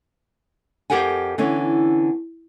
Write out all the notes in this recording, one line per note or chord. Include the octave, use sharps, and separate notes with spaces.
F2 A3 G4 A#4 F#5 G#5
D3 E3 B3 C#4